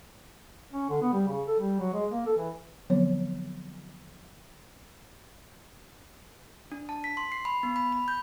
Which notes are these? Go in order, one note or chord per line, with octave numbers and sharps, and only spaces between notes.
C#4
D3
B3
G3
C#3
A4
G3
F#3
G#3
A#3
A4
E3
D3 F3 F#3 B3 C4 C#5
D4
A5
B6
C6
C7
B5
B3
B5
B5
G6